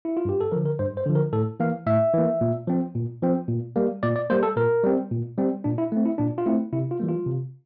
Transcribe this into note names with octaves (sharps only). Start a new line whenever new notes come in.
E4
F4
G2 G4
A4
D3 F3 A#4
A#4
G2 C5
C5
D3 F3
A#4
A2 A4
E3 A#3 F5
A2 E5
E3 A#3
A#2
F3 C4
A#2
F3 C4
A#2
G3 A#3
A#2 D5
D5
G3 A#3 C5
A4
A#2 A#4
G3 C4
A#2
G3 C4
A#2 D4
E4
A3 C4
E4
A#2 D4
F4
A3 C4 E4
C3 E4
F4
E3 G3 A#3
F4
C3